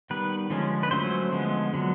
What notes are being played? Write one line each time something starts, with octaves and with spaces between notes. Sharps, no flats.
D#3 G3 B3 B4
D3 F3 G#3 C#4
B4
F#3 A3 C#4 C5
D3 F3 G#3 B3
D3 F#3 B3